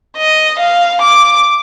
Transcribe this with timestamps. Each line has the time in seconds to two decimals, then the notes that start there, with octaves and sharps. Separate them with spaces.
0.17 D#5
0.59 F5
1.01 D6